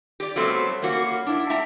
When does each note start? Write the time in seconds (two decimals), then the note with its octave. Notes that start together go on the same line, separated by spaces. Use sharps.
0.20 G4 D5
0.36 F#3 G3 A3 B3 C4
0.82 G3 A#3 C#4 F#4
1.26 D4 E4
1.50 A3 E5 G5 A#5